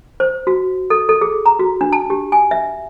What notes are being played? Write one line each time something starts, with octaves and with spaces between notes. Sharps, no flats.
C5
F#4
A4
A4
G#4
A#5
F#4
D4
A5
G4
G#5
E5